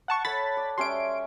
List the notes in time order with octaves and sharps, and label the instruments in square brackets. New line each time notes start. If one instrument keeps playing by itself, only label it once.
[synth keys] F#5 A5 C#6
[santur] A4 C#5 F#5 [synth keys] B5 A6 B6
[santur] D5
[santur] G3 C#4 E5 [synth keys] C6 D7